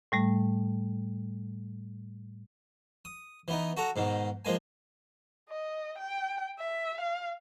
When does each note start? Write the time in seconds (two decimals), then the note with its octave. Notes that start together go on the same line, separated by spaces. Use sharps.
0.12 A2 G3 A3
3.05 D#6
3.48 E3 B3 D#4
3.77 F#4 A4 F#5 A#5
3.96 G#2 B2 D#3
4.45 F3 G#3 A#3 G#5
5.49 D#5
5.98 G5
6.59 E5
7.01 F5